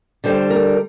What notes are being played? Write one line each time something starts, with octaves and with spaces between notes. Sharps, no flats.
D3 G3 C5
A#4